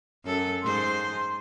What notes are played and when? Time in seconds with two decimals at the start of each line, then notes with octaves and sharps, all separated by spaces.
0.25 F#2 A4
0.63 G#2 C5 C6